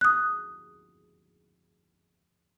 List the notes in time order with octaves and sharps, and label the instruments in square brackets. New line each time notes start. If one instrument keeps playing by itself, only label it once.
[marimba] D#6 F#6